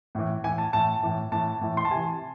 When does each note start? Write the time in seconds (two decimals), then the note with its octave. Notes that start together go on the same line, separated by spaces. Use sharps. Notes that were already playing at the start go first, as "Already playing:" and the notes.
0.15 A2 E3
0.44 A2 E3 G#5
0.58 A5
0.73 A2 E3 A5
1.03 A2 E3
1.32 A2 E3 A5
1.61 A2 E3
1.77 C6
1.85 A5
1.91 C3 E3 G#5